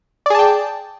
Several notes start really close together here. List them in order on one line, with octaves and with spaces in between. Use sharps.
D5 G#4 A5 G5